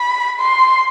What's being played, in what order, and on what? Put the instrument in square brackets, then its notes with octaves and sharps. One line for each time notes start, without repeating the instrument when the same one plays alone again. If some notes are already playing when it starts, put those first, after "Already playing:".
Already playing: [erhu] B5
C6